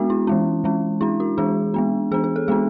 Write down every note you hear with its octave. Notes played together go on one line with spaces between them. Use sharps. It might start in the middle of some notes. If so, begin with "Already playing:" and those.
Already playing: G#3 B3 D4 F#4
E4
E3 G#3 C#4
E3 G#3 C#4
G#3 D4 E4
F#4
E3 G#3 D4 G#4
G#3 B3 D4
E3 B3 D4 G#4
G#4
A4
G#3 B3 D4 G#4